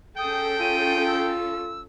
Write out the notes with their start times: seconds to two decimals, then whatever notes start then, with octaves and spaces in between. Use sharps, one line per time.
0.18 C#4 G#4 A4 G5 D#6
0.60 F4 D#7
1.07 E6